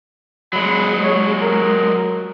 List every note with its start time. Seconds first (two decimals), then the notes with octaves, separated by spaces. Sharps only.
0.53 F#3 G#3 B5
1.03 C#5
1.42 A#4